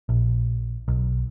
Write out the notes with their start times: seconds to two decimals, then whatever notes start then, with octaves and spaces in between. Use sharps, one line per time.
0.09 A#1
0.88 B1